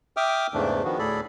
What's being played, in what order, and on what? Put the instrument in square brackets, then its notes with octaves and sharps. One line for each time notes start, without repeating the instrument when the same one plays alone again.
[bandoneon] E5 G5 D6 D#6 F6
E2 G#2 C#3 E3 A3 D4
D#3 F3 B3 F#4
D2 A2 G#4 A4 D5 B5